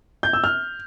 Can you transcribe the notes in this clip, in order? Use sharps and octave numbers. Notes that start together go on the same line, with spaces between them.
G6
E6
F6